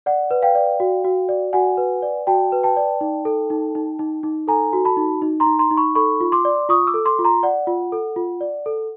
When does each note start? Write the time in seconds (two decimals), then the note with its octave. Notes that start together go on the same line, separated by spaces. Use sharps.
0.06 D5 F#5
0.31 B4
0.42 F5 G5
0.55 D5
0.80 F#4
1.04 F#4
1.29 D5
1.53 F#4 F#5 G#5
1.77 B4
2.02 D5
2.27 F#4 G5 A5
2.52 B4
2.63 G5 A5
2.77 D5
3.01 D#4
3.25 A4
3.50 D#4
3.75 D#4
3.99 D#4
4.23 D#4
4.48 A4 G#5 A#5
4.73 F#4
4.85 A5 B5
4.97 D#4
5.22 D#4
5.40 A#5 C6
5.47 D#4
5.59 A#5 C6
5.71 D#4
5.77 B5 C#6
5.95 A4 B5 C#6
6.20 F4
6.32 C6 D6
6.45 D5
6.69 F4 C#6 D#6
6.87 D6 E6
6.94 A4
7.06 C6 D6
7.19 F4
7.24 A#5 C6
7.43 D5 F#5
7.67 F4
7.92 A4
8.16 F4
8.41 D5
8.66 A4